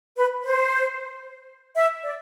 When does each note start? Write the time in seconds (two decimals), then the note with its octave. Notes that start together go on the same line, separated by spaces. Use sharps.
0.16 B4
0.43 C5
1.76 E5
2.02 D5